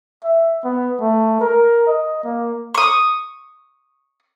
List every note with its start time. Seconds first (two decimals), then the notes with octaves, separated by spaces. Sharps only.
0.24 E5
0.65 B3
1.01 A3
1.41 A#4
1.87 D#5
2.24 A#3
2.75 C#6 D#6